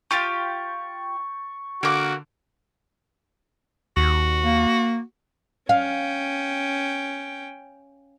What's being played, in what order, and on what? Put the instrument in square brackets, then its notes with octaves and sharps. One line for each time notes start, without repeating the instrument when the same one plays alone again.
[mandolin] F4 G4 F5 [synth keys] C#6 [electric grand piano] G6 A6
[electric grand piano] D3 [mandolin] A#3 D6 [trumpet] F#4
[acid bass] D#2 [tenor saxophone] F#4
[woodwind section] A#3
[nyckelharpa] C#4 G5 [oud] F5